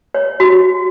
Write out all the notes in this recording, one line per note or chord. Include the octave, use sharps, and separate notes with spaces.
C#5
F#4